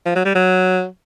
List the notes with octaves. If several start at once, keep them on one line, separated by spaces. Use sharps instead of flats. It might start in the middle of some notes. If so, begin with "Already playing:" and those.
F3
F#3
G3
F#3